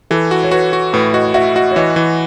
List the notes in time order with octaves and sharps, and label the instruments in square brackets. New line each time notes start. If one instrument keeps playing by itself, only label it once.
[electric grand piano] E3 [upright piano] A4
[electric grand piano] F#4
[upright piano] C#5
[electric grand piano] F#4 [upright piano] B4
[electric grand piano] F#4
[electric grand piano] A2 [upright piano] B4
[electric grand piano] F#4 [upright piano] D#5
[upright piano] D#5
[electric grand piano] F#4 [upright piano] E5
[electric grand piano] F#4 [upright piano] D#5
[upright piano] C#5
[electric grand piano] E3 [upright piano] D#5
[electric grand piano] E3